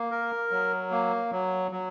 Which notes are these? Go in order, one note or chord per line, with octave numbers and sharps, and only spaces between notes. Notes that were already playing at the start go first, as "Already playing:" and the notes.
Already playing: A#3
A#4
F#3
A#3
F#3
F#3